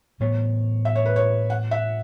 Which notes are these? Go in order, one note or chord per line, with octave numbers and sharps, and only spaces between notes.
A2 E3 B3 C#5
E5
C#5
B4
C#5
F#5
E5